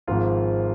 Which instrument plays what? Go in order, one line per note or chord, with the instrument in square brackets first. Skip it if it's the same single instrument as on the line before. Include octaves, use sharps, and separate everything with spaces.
[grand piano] G#1 G#2 F3 G#3 F4